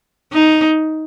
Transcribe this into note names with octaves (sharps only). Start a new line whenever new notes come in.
D#4